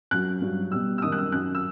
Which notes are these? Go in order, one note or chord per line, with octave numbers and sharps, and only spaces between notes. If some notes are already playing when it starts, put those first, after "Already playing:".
F#2 F#3 F#6
G2 F#3
B2 G3 E6
E6
F#2 D#3 G3 D#6
F#6
E6
F#2 F#3 F#6
E6